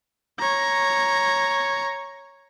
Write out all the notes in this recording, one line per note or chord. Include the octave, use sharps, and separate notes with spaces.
C#5 A#5